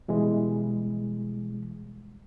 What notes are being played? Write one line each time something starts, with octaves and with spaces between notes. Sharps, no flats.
B2 E3 G3 G#3